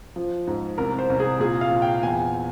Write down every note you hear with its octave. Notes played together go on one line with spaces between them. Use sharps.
F3
G#2
C2 A#4
C5
C2
G#4
A#2 G#4
F5
A#2
G5
E2 G#5